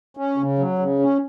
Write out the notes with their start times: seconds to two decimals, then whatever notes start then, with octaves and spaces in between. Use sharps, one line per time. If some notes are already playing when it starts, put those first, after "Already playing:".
0.17 C#4
0.38 C#3
0.59 F#3
0.79 C#3
0.99 C#4